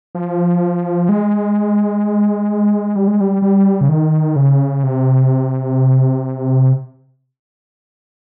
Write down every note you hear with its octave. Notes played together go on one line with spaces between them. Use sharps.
F3
G#3
G3
G#3
G3
G3
C#3
D#3
C#3
C3